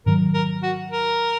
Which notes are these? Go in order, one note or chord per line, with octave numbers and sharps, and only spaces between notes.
G#2 D#3 F#3 A#4
A#4
F#4
A#4